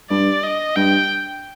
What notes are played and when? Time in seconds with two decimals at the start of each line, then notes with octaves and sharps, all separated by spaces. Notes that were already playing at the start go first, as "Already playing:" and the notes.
0.10 G2 D5
0.43 D#5
0.76 G2 G5